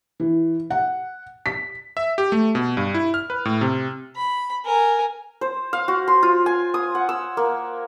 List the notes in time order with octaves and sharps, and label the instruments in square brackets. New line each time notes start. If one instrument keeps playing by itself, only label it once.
[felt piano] E3
F#5
B6
[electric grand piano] E5
G4
A3
B2
G2
E4
F6
B4
A2
C3
[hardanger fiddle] B5
A#4 G#5
[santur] C5
F5
F#4
C6
F4
G#5
D#6
F#5
E6
A#3